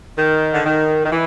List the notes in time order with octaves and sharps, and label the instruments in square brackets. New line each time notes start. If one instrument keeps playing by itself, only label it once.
[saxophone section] D#3
D3
D#3
D#3
E3